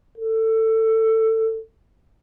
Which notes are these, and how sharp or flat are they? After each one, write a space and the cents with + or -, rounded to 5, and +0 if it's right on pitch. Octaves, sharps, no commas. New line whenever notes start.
A4 +20